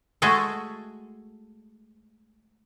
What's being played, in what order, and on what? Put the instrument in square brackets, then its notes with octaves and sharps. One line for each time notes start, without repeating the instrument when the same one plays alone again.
[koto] G#3 A3 F#4 G#4 A4